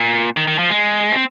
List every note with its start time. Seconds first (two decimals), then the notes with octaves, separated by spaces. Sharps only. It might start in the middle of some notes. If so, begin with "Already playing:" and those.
Already playing: A#2
0.37 D#3
0.47 D#3
0.58 F3
0.69 G#3
1.12 C4